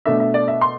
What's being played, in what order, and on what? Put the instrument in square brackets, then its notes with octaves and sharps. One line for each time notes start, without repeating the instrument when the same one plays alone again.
[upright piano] B2 A3 D4 E5
E5
D5
E5
C6